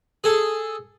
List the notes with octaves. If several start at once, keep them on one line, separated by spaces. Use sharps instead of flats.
G#4 A4